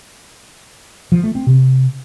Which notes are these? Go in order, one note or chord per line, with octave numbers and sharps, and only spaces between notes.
F3
A3
C4
C3